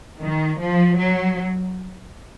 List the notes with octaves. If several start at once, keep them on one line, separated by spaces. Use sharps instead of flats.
D#3
F3
F#3